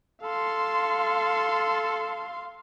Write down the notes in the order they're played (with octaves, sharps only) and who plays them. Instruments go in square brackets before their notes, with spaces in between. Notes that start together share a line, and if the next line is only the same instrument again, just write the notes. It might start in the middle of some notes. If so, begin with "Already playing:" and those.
[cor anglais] A4 [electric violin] F5 C6